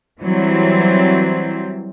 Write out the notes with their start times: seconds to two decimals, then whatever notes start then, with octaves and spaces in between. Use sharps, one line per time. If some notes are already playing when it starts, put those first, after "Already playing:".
0.20 E3 F#3 G3 C4